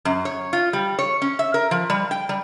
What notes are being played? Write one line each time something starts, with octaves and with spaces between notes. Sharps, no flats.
F#2
C#5
F4
G3
C#5
C#4
E5
A#4
F3
G3
G5
G3